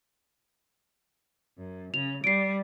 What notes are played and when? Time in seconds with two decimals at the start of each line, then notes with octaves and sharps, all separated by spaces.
1.58 F#2
1.94 C#3 F7
2.24 G3 C7 D7